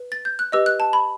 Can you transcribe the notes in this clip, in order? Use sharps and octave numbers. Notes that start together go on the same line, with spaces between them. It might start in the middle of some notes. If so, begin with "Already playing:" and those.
Already playing: B4
A6
G6
F#6
G4 B4 D#5 E6
F#6
A5
B5